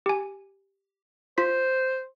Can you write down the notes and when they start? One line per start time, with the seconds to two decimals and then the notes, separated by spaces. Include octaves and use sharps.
0.06 G4 G#5
1.38 F4 C5 B6